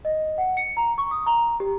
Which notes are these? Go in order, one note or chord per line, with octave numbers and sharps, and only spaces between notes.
D#5
F#5
C#7
A#5
C#6
D#6
A#5
G4